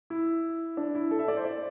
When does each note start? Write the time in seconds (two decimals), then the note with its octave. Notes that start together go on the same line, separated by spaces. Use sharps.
0.10 E4
0.77 D4
0.95 E4
1.11 A4
1.19 E5
1.28 D5
1.37 C5
1.45 D5